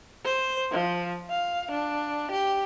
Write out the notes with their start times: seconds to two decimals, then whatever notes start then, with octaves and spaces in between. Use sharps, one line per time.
0.25 C5
0.71 F3
1.30 F5
1.71 D4
2.31 G4